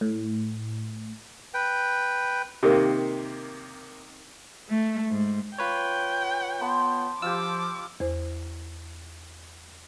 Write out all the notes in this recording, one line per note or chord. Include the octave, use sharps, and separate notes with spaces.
A2
B4 G5
C3 D#3 A#3
A3
G#2
F4 B4 C#5 G5
B3 A5 B5 C6
F3 F4 G4 D6 E6
E2 C5